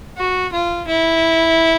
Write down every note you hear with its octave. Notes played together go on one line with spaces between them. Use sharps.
F#4
F4
E4